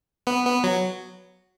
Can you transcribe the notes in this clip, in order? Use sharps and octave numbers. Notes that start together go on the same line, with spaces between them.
B3
B3
F#3